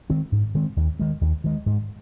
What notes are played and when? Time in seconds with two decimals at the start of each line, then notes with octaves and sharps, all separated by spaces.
0.09 D#3 G#3 C4
0.32 G#2
0.55 D#3 G#3 C4
0.77 D#2
0.99 D#3 G#3
1.21 D#2
1.44 D#3 G#3
1.66 G#2